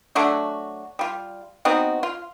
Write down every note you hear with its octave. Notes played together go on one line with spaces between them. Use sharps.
F#3 A3 D4 F#4
G3 F4
B3 C4 D#4 F#4
F4